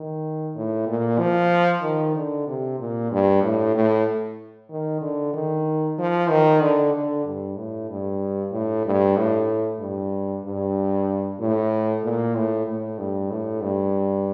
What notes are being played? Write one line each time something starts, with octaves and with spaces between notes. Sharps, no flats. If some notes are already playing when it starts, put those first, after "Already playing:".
Already playing: D#3
A2
A#2
F3
D#3
D3
C3
A#2
G2
A2
A2
D#3
D3
D#3
F3
D#3
D3
D3
G2
A2
G2
A2
G2
A2
G2
G2
A2
A#2
A2
A2
G2
A2
G2